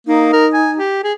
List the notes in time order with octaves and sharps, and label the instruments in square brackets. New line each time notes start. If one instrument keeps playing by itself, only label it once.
[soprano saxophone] A#3 [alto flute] D#4
[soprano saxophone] A#4
G#5
G4
G#4